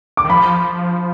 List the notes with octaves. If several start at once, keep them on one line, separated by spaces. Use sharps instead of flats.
D6
D#3
F3 B5